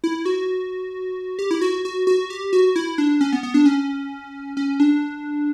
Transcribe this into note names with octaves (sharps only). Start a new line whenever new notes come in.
E4
F#4
G4
E4
F#4
F#4
F#4
G4
F#4
E4
D4
C#4
B3
B3
D4
C#4
C#4
D4